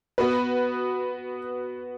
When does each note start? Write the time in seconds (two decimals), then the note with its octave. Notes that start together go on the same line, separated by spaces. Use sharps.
0.18 B3 F#4 B4